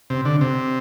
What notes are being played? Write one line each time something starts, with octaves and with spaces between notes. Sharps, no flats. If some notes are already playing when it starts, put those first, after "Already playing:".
C3
D3
C3